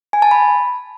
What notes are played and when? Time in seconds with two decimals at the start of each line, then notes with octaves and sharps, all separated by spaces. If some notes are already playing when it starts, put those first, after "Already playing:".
0.13 G#5
0.22 A5
0.31 B5